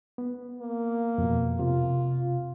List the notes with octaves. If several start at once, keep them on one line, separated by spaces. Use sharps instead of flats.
B3
A#3
F2 B2
C3 F4